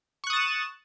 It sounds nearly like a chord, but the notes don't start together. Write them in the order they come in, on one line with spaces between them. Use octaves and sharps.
C#6 F#6 D#6 A6 E7